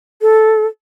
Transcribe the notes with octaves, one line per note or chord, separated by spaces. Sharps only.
A4